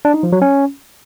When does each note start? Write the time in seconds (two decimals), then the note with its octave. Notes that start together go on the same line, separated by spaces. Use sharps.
0.05 D4
0.14 D#4
0.23 F3
0.32 F#3
0.42 C#4